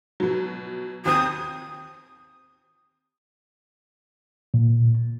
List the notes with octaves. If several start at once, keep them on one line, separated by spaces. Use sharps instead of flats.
B2 F#3
D#2 C4 D#6 G6
A#2